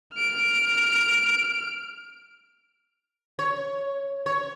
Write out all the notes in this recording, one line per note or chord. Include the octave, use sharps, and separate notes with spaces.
F6 D7
C#5
C#5